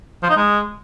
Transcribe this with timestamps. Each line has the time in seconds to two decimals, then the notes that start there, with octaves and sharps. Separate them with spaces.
0.23 F3
0.30 D#4
0.36 G#3